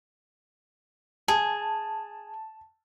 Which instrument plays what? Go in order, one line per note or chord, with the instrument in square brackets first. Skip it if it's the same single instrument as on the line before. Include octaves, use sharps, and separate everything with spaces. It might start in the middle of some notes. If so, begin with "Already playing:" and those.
[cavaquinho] G#4 [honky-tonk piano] A5